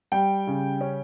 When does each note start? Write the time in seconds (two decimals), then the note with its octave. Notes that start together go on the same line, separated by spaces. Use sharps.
0.12 G3 G5
0.47 C#3
0.81 C#4